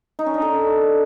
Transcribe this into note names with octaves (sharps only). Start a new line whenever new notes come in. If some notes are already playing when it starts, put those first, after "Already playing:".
D#4
C#4
D4
A4